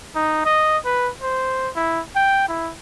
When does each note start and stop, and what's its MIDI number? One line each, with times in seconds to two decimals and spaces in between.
0.15 0.43 63
0.45 0.78 75
0.85 1.10 71
1.22 1.70 72
1.76 2.01 64
2.16 2.45 79
2.48 2.72 64